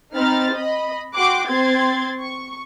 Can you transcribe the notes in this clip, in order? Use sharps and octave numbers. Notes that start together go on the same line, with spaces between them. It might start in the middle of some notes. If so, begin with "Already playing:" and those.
C4 D#4 B5 F6 A6
D#5 B5
F#4 G5 C6 D6 F#6
C4 C6 G#6 A6
C#6